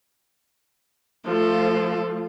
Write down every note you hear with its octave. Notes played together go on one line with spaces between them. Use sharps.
F3 A3 F4 A4